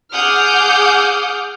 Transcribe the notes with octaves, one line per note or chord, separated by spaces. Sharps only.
G#4 F#5 D6 D#6 F6 G6